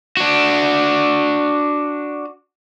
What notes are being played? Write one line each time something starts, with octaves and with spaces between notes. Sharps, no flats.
D4 F#4